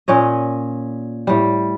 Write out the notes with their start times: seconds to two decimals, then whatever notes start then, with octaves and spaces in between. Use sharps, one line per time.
0.08 A#2 C#4 C#5 D#5
1.27 A2 G3